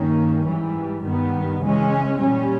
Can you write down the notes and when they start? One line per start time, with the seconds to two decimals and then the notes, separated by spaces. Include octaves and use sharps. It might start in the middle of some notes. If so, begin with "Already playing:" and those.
Already playing: G2 D#3 A#3 C#4
0.44 G#2 E3 G3
1.03 G2 D#3 G3 B3
1.61 C#3 E3 G#3 C#4
2.19 A#2 G3 C#4